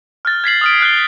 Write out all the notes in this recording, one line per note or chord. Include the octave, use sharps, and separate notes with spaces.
F6 F#6 A6
G#6 B6 C7 F#7
D#6 F6 D7
F6 F#6 D7 G7